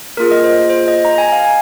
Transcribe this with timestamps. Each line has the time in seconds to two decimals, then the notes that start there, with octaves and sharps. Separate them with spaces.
0.17 A#3 F4 G#4 A#4
0.31 D#5
0.44 C5
0.69 C5
0.88 D#5
1.05 A#5
1.18 G#5
1.32 F5
1.45 G#5